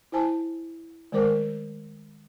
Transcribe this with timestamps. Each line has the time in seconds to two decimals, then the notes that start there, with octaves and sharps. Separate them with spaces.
0.12 E4 C5 G#5 A5
1.12 D#3 G#3 A3 A#4 C5 D6